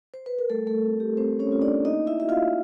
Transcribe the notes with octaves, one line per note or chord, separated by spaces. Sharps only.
C5
B4
A#4
G3 A3 A4
A3 A4
C4 F4
G4
G3 C4 C5
C#4 C#5
C4 F4
D4 D5
A#3 D#4 D#5
E4 E5
D#4 F#4 E5
F4 F5